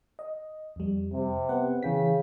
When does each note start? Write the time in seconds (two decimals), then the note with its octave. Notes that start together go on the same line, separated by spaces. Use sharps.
0.19 D#5
0.76 F2 G3
1.13 C3
1.49 B3 B4 F#5
1.83 C#3 E3 G5 B6